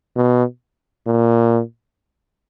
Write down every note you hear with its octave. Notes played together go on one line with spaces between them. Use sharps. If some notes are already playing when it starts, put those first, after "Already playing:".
B2
A#2